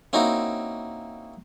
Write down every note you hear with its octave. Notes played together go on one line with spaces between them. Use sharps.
A#3 C4 C#4 D#4 E4 F#4